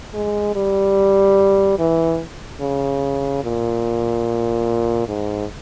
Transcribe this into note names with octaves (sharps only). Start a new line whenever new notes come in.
G#3
G3
E3
C#3
A#2
G#2